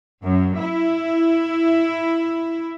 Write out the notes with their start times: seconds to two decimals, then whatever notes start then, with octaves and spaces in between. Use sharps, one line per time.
0.23 F#2
0.60 E4